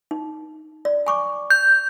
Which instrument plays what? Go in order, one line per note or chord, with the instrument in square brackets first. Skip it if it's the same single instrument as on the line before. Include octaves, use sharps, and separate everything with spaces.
[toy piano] D#4
D5
G#5 C#6 D6
[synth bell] G6